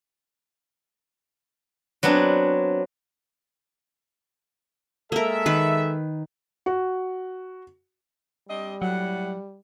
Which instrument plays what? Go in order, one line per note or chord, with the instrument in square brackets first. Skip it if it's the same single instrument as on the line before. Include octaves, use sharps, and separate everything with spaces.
[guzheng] F#3 B3 C4 D4
[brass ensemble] G#3 A4 E5 [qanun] A#3 A#4
[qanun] D#3 B4
[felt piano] F#4
[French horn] G3 [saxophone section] C4 D4 D#5
[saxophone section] A2 F#5 [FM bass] F#3